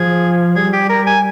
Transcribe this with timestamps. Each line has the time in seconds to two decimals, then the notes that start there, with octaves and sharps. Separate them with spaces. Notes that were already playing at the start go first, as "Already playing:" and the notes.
Already playing: F3 G#4
0.56 G3 G#4
0.73 G4
0.89 A#4
1.07 G#5